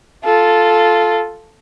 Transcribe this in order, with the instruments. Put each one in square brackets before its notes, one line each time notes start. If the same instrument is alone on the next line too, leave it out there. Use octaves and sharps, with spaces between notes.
[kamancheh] F4 A4